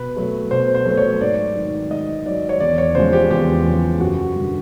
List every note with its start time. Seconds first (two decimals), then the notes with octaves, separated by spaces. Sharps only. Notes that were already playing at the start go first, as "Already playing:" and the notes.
Already playing: B2 B4
0.16 F#3 A3
0.51 B2 C5
0.75 C5
0.85 F#3 A3
0.97 C#5
1.21 G#2 D5
1.55 D#3 F#3
1.90 G#2 D#5
2.26 D#3 F#3 D5
2.49 C#5
2.60 E2 D5
2.78 C#5
2.95 C#3 F3 G#3 C5
3.13 G4
3.31 E2 G4
3.66 C#3 F3 G#3
4.00 F#2 F#4
4.36 D3 G3